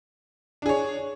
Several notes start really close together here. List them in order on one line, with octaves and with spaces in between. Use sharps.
D4 G#4 C#5